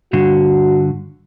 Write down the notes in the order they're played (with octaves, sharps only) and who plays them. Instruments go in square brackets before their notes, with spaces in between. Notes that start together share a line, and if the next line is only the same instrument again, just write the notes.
[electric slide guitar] G2 D3 [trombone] F#4